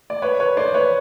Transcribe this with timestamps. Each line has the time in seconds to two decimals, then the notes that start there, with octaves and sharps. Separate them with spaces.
0.10 D5
0.22 B4 C#5
0.40 B4 C#5
0.57 C5 D5
0.74 B4 C#5